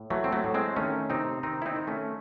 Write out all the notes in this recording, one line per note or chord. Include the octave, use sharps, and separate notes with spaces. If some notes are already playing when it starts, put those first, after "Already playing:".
Already playing: A2
E3 F#3 A3
C4
F#3 A3
A2
G#3 C4
D#3 A3 C#4
C3 C4 D#4
D#3 C4 D#4
E4
C4 D#4
D#3
A3 C#4